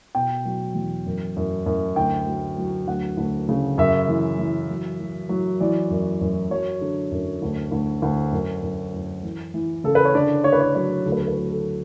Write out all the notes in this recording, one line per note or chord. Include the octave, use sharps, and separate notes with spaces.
B2 G5
F#3
E2
F#2
F#2
F#2
D2 G5
F#3
F#3
D2 F#5
D2
C#3
F#2 E5
E3
E3
F#3
F#3
F#3
E3 D5
F#2
F#2
F#3 C#5
D3
F#2
D2
D2
D2
F#2
F#2
F#2
E3
E3
C#3 A4
B4
C#5
D3 D5
D3 C#5
B4
C#5
F#3 C#5
D2 A4
B4
A4
B4
F#3
A4